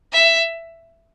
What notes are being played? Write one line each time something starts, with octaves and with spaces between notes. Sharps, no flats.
E5